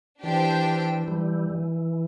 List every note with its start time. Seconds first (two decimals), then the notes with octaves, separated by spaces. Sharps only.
0.23 E3 D4 G4 C5 G5
1.08 E3 G3
1.50 E3